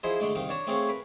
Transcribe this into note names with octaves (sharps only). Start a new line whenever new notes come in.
F3 E4 G#4 C5 D#5
D3 G#3 A3 D4
C2 D#3 D#4 F5
D4 C#5 A5 A#5
A3 C4 G#4 A#4 C#5 F5
A#4 B4